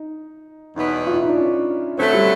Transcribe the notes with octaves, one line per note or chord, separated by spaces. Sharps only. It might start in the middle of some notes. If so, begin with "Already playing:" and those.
Already playing: D#4
E2 B2 F#3 B3 D#4
F4
E4
D#4
D4
C#4
D3 F#3 A3 C4
G3